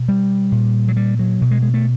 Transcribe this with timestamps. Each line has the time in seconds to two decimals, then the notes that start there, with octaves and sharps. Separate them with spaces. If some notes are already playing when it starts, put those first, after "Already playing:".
Already playing: B2
0.08 G3
0.52 A#2
0.88 F#3
0.97 G3
1.19 F#3
1.41 B2
1.51 G#3
1.62 G#3
1.74 A3